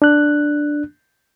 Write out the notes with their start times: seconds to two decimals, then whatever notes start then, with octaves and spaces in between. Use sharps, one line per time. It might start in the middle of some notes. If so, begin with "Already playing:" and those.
0.02 D4 F#6